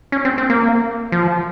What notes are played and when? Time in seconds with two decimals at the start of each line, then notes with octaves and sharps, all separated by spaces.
0.12 C#4
0.25 C4
0.38 C4
0.50 A#3
1.12 F3